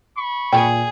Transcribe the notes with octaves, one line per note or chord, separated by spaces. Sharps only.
B5 C#6
A#2 G#4 G5